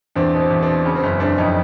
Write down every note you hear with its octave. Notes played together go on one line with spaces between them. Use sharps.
E2 C4 D4
B2
C4
E2
C4 D4
B2
C#3 C#4
C4
F#1 C#4
F#1 C4 D4
F2 C#4 D#4